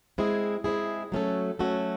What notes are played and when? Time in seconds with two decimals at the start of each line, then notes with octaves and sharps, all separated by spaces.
0.18 G#3 C4 E4 G#4
0.64 G#3 C4 E4 G#4
1.12 F#3 A3 C#4 F#4 A4
1.59 F#3 A3 C#4 F#4 A4